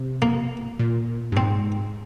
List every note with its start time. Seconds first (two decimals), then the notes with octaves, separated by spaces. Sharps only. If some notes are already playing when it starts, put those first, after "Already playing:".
Already playing: C3
0.22 A#3
0.79 A#2
1.32 G2
1.37 G#2 C4